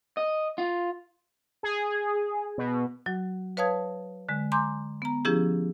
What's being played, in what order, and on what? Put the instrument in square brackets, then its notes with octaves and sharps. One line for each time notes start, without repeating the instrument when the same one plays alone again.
[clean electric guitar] D#5
F4
[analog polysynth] G#4
B2
[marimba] F#3 F#4
B4 C#5 F5 A5 D#6 G#6
D3 G#3
G#5 A#5 C6 D6 G6
B3 A#5
F3 C#4 E4 G4 G#4